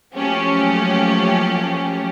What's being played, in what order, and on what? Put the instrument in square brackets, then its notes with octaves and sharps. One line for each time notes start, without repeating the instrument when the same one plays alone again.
[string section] F3 F#3 A3 A#3 C#4 G4